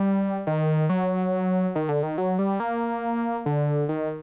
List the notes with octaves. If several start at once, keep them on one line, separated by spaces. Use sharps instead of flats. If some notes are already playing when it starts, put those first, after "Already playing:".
Already playing: G3
D#3
F#3
D#3
D3
D#3
F#3
G3
A#3
D3
D#3